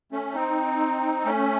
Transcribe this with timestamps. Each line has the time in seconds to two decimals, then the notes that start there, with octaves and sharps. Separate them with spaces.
0.12 A3 C#4
0.35 C4 D#4
1.25 A3 C#4